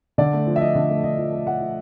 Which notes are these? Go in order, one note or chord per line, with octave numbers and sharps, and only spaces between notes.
D3 D5
A3
F3
E5
F3 D#5
D3
A3
D3 D#5
F3
A3
A3 F#5
F3